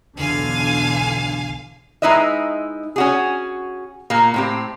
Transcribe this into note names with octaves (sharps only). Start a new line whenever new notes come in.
B1 E2 D3 F5 G#5
G#3 D#4 E4 B4 D#5 E5
C#4 F#4 G#4
A#2 A#3
A2 C4 G4